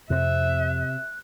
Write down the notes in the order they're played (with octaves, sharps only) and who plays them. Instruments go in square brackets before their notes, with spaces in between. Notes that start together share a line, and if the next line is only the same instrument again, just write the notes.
[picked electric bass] F2 C4 [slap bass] C3 [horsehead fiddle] E5 [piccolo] F#6